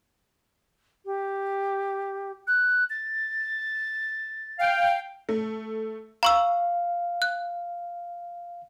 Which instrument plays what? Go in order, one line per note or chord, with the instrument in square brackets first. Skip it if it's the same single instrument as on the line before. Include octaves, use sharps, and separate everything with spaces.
[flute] G4
[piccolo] F#6
A6
[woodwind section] F5 G5
[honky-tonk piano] A3
[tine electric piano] F5 [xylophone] A#5 C#6 E6
[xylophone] F#6